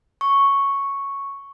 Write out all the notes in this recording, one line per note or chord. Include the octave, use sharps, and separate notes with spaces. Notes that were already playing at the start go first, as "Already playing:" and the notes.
C#6